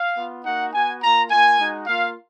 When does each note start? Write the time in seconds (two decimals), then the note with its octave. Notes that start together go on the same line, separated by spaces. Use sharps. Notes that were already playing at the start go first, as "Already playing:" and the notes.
Already playing: F5
0.15 B3 F4
0.44 A#3 D#4 F#4 F#5
0.72 B3 F#4 G#5
1.01 A#3 F4 A#5
1.29 A#3 F4 G#5
1.58 G#3 D#4 F#4
1.87 A#3 F4 F5